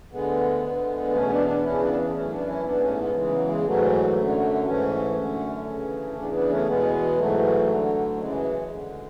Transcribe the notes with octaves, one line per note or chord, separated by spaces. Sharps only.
D2 D3 G#3 B3
D2 D3
E2 B2 A3 C#4
B3 D4
B3 D4
E2 C#3 E3 C#4 E4
B3 D4
F#2 E3 A3 C#4
B3 D4
C#4 E4
G#2 E3 B3 D4
A3 C#4
G#3 B3
E2 C#3 E3 G#3
F#3
G#3
G#2 E3 F#3 A3
F#2 D3
G#2 E3 A3 C#4
F#2 D3
D2 C#3 E3
E2 C#3 E3 B3 D4
B3 D4
A3 C#4
E2 B2 G#3 B3
G#2 E3 F#3 A3
D2 D3
F#2 C#3 E3 G#3
D2 D3